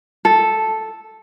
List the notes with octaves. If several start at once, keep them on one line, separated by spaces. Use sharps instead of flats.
A4